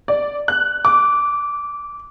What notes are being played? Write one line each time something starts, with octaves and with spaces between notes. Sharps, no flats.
D5
F#6
D6